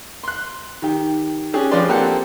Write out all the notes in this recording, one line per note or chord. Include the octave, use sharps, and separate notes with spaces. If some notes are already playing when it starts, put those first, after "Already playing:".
C6 F#6
D#3 G4
C#4 D4 G4 G#4
F3 G#3 D4 B4 D5 C6
A#3 C4 G4 A4 F#5